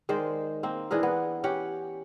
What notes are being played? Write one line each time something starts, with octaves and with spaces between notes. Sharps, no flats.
D#3 G#3 C5 D5
A#3 C4
E3 D4 G#4 A#4
B3
C#4 G4 F#5